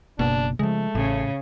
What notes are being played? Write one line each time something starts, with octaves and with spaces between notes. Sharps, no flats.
F#1 B2 A#3 D4
C#3 F3 G#3 A3
A1 A2 C#3